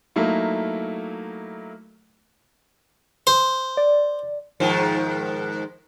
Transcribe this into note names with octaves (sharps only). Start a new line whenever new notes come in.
F#3 A3 A#3 D#4 E4
C5
D5
G#2 D#3 F3